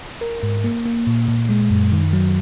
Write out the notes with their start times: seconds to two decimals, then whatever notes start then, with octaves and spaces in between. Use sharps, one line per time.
0.21 A#4
0.43 G#2
0.64 A#3
0.86 A#3
1.07 A#2
1.28 A#2
1.49 G#3
1.70 F#2
1.92 D#3
2.13 F#3